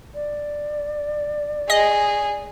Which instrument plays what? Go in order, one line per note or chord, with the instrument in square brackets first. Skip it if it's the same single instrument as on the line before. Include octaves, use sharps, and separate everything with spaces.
[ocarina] D5
[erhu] G#4 [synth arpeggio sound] D#5